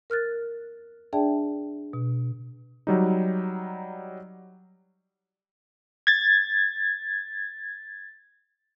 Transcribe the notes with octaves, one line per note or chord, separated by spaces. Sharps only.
A#4 F6 F#6 A6
D4 G#4 D5 E5 G5 A5
B2
F#3 G3 D#4
G#6 A6